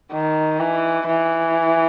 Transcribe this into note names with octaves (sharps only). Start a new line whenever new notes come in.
D#3
E3
E3